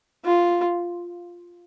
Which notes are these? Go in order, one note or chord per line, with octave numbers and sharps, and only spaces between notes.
F4